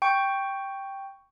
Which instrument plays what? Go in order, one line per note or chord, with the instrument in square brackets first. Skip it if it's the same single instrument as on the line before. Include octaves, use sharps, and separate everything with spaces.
[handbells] G5 C#6